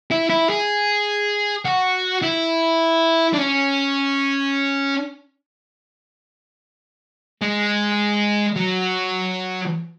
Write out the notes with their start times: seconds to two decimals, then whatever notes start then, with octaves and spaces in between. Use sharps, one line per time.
0.11 E4
0.30 E4
0.50 G#4
1.65 F#4
2.22 E4
3.33 D4
3.38 C#4
7.41 G#3
8.56 F#3